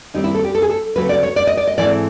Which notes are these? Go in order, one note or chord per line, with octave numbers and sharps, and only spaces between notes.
D#2 D#3 G3 C4 D#4
E4
A4
G4
A4
G#4
A4
D2 C#3 F#3 A3 C4 B4
D5
C#5
D5
D#5
D5
D#5
G#2 E3 A3 C4 D5